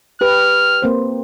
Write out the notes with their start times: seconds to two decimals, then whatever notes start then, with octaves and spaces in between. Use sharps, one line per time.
0.21 G4 B4 F6
0.82 A#3 C4 C5